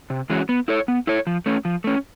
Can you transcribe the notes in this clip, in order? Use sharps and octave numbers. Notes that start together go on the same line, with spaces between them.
C3
E3 G#3 C#4 F#4
B3
E4 A4 C#5
B3
E4 A4 C#5
F3
A3 C#4
F3
A3 C#4